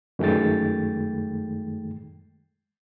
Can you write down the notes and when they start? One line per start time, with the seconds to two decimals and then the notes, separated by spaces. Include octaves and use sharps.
0.19 F#2 D#3 G#3 A3 G5 A6